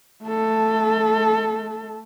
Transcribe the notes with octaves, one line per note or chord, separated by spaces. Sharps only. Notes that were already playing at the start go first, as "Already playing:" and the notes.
A3 A4